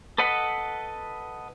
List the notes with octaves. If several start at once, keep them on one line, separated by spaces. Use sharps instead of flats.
A4 B4 D#5 F#5 B5